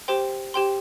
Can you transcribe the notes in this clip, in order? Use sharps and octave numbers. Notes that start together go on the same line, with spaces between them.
G4 C5 G5 C6
G4 C5 G5 C6